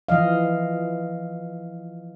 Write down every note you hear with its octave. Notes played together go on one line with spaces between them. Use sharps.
E3 F3 D#5 F5